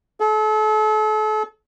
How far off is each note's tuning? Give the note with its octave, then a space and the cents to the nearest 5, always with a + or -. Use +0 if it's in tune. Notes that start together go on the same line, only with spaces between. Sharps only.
A4 -40